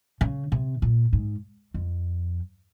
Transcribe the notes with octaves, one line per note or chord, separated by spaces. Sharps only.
C#3
C3
A#2
G#2
F2